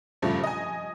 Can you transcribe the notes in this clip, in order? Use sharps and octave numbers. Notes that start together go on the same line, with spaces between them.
G2 A#2 C#3 F3 A3
D#5 G#5